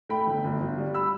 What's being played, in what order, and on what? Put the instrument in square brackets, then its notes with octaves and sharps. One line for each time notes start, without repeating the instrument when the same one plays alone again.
[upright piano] A3 G5 B5
G1
G1
G1
G3
B5 E6